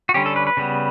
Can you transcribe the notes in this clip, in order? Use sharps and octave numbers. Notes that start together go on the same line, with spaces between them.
F#4
D3 G3 C#4 G4
A4
B4
B4
C#3 G3 B3